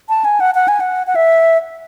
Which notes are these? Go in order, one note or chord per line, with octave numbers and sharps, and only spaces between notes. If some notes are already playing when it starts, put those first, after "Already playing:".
A5
G#5
F#5
F#5
G#5
F#5
F#5
E5